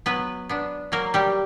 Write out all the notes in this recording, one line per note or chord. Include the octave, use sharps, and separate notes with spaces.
F#3 B3 B4
B3 D4
F#3 A#3 A#4
G3 G4